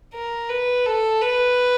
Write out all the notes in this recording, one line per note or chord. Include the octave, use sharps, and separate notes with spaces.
A#4
B4
A4
B4